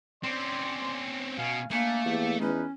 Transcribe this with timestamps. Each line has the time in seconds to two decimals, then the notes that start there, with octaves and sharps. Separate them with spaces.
0.23 C4 C#4 D5 C6
1.39 B2 C#4 F5 G#5
1.71 A3 A#3 D4 A#4 G#5
2.05 E2 G4
2.40 E2 C#4 D#4 B4